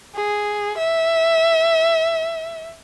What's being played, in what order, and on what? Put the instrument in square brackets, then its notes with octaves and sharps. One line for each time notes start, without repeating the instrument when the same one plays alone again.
[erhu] G#4
E5